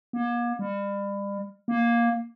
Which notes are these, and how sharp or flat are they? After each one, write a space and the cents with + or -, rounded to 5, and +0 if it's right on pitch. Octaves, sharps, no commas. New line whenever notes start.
A#3 +40
G3 +35
A#3 +10